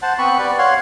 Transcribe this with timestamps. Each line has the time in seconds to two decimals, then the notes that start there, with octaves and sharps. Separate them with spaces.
0.02 C5 F#5 A5
0.18 B3 C4 B5 C#6
0.39 G4 B4 D5
0.58 C#5 F5 F#5 C6